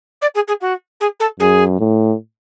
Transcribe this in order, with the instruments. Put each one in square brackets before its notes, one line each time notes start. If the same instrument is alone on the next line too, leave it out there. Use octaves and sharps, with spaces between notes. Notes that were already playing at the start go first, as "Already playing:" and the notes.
[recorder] D5
G#4
G#4
F#4
G#4
A4
[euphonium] F#2 [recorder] G#4
[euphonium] A2